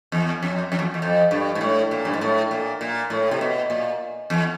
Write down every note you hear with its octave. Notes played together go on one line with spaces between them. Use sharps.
E2
F2
F2
E2
E2
F2
G2
G#2
A2
A#2
G2
G#2
A2
A#2
A#2
A2
C3
B2
A#2
E2